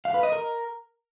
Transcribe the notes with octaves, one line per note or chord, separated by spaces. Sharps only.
F5
B4
D#5
A#4